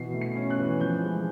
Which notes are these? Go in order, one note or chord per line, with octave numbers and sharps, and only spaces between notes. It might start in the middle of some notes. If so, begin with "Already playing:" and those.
Already playing: B2 E3 C7
A3
C7
C#4
F#6
E3
F3 G6
G#3